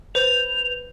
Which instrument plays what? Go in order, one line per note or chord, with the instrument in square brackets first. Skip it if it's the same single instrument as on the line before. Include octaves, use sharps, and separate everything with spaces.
[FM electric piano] B4 G6 [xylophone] C5 [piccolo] F7